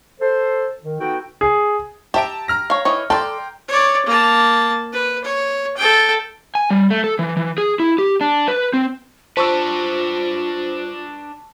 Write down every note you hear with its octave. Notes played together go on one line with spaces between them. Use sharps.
A4 C5
D#3
B3 D#4 F#4 A4 G5
G#4
G4 E5 A5 A#5 D7
A#5 F6 A#6
C#5 F5
E3 D#4 C#5
A4 B4 D5 G5 A#5 C6
C#5 D5
A#3 A5
B4
C#5
A4 G5
G#5
G3
A3
A4
E3
E3
G#4
E4
G4
D4
B4
C4
D4 F4 B4 C5 A5 C#6 E6